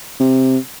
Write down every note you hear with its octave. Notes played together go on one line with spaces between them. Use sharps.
C3